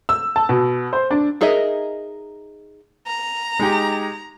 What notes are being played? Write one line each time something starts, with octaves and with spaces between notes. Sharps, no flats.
E6
A5
B2
C5
D4
D#4 G#4 A#4 D#5 E5
A#5
G#3 D#4 G4